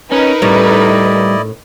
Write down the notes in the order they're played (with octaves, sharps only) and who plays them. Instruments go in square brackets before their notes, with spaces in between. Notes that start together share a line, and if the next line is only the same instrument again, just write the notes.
[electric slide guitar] C#4 [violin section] D#4 A#4 B4
[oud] A2 C#4 [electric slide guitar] G3 [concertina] E4 D5 D#5